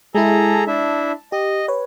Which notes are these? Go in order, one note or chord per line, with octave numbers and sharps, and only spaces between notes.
G#3 E4 G#4 A4 A#5
A5
D4 E4 E5
G4 D#5
B4 C#5